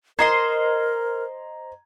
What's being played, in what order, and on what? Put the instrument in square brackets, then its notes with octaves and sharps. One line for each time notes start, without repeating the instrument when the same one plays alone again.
[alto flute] A#4 [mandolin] C5 D#5 C6 [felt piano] A#5 G#6